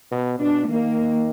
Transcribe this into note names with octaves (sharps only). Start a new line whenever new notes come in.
B2
B2 D4
D#3 A#3